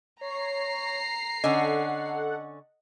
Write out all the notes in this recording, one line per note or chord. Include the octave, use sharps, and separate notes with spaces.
C#5 A#5 C7
D3 C#4 A4 D#5 F#5